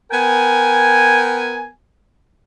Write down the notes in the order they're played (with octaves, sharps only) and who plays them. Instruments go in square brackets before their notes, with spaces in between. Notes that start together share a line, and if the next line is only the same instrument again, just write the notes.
[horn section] B3 A#4 G5 G#5